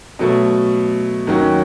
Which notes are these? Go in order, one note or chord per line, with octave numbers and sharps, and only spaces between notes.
B2 F#3 A3
D#2 D#3 F#3 C#4 F#4